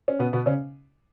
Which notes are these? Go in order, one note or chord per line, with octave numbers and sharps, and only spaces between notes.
C#4
B2 B3
B2 B3
C#3 C#4